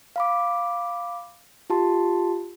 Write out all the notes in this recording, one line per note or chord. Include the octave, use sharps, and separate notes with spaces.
F5 B5 D6
F4 G4 A5 C6